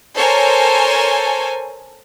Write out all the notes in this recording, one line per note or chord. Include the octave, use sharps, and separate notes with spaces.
A4 A#4 C5 C#5 G#5